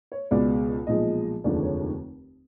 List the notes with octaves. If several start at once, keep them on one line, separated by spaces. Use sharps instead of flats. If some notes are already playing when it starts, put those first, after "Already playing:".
C#5
C#2 B2 G#3 B3 D5
B1 A#2 F3 G#3 D#5
F1 D#2 D3 F3 G#3 D5
C#5